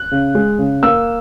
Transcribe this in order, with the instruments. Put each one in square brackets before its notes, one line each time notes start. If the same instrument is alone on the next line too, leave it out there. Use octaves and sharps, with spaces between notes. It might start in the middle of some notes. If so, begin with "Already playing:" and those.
Already playing: [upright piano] F#6
C#3
G#3
C#3
A#3 E6